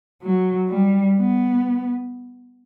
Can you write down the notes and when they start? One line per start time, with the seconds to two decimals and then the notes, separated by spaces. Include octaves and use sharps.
0.22 F#3
0.69 G3
1.17 B3